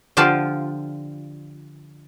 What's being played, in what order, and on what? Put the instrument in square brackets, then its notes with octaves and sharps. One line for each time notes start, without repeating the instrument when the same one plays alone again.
[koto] D3 F3 F4 G4 A5